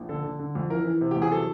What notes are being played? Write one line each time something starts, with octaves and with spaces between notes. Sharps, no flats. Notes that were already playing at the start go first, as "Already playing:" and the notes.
Already playing: A#1
D3 A4
D3
D3
F2
E3 A#4
E3
C3
E2 G4
G#4
F#3 A4